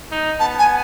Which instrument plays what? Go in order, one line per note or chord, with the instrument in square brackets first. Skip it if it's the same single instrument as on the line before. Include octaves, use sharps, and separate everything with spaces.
[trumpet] D#4
[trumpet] B3 [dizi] A5
[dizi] G#5